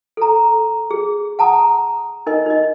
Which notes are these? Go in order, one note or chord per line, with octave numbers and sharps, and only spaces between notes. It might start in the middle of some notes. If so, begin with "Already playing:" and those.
A4 A#5
G#4
F#5 A5 A#5 D#6
D#4 A#4 D#5
D#4 D#5